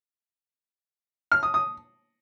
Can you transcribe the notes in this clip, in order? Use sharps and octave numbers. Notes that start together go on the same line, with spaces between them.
F6
D#6
D#6